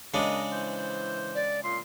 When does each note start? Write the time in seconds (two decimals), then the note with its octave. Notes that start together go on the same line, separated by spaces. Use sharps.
0.14 A#2 C#3 G#3 D4 A#4 D#5
0.52 E3 C5
1.35 D5
1.63 A#2 C6